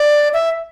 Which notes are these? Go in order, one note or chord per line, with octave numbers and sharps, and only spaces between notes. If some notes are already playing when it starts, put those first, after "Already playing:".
Already playing: D5
E5